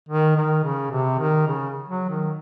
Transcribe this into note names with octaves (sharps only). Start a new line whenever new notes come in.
D#3
D#3
C#3
C3
D#3
C#3
F#3
D#3